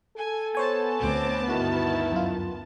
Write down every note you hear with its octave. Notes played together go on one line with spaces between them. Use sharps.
A4 G#5
B3 C5 C#5 G#5 A5
D2 C4 D6
G2 D#3 E4 F#4
F#2 F4